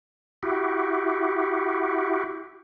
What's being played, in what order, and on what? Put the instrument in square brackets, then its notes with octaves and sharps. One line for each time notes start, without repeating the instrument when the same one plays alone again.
[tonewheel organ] E4 F#4 G4